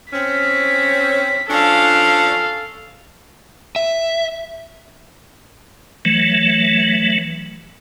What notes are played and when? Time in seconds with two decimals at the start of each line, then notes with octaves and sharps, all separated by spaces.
0.13 C4 C#4 B6
1.49 F3 C#4 D4 A4 F5
3.76 E5
6.05 E3 F#3 A3